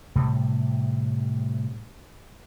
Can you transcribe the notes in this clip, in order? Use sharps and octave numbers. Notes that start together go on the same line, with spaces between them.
A2 C3 G3